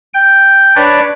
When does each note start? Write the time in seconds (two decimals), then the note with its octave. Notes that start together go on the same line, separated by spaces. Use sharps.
0.14 G5
0.76 D4 B4 C#5 D5